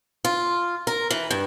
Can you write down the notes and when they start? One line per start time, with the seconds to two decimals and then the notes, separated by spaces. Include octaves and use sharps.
0.25 F4
0.87 A#4
1.11 E3
1.31 G2